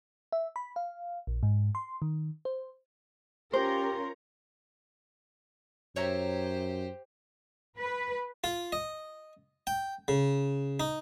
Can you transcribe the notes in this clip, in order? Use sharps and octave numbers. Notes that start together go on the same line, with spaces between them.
E5
B5
F5
A#1
G#2
C6
D#3
C5
C#4 F4 G4 A#4 C5 C6
F#2 G4 C5 C#5 E5 A#5
B4
F4
D#5
G5
C#3
D#4